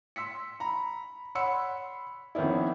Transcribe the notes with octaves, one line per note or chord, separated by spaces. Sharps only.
C6 E6 B6 C#7
A#5 B5
C#5 F#5 B5 C6 E6 C#7
F2 D#3 B3 C#4 E4